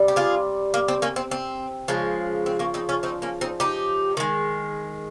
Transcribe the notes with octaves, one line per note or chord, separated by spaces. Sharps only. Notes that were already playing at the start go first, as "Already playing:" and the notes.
Already playing: C3 G3
G4
F4 G#4
A#3
C4
A#3 C#4
C4
C4
C#3 F3 G#3
C4
A#3 C#4
C4 D#4
C#4 F4
C4 D#4
A#3 C#4
C4 D#4
D#4 G4
D#3 G#3